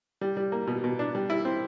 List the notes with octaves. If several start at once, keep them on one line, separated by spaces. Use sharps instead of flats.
G3
G3
A#3
B2
B2
D4
G3
E4
C4